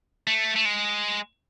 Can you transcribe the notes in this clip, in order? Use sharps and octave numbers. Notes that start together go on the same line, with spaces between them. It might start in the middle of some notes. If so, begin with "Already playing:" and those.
A3
A3
G#3